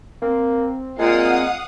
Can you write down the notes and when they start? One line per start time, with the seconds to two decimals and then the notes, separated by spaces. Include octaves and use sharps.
0.22 A#3 C4
0.99 A#2 G#3 F5 F#5 D#6